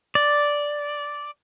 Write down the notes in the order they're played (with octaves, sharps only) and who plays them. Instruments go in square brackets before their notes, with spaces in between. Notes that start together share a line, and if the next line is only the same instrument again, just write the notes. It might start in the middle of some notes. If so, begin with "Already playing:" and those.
[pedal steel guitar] D5